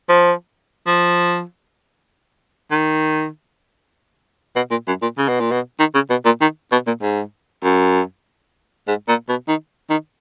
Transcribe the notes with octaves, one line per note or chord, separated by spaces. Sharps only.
F3
F3
D#3
B2
A#2
F#2
A#2
C#3
B2
A#2
B2
D#3
C#3
B2
A#2
D#3
B2
A#2
G#2
F#2
G#2
A#2
B2
D#3
D#3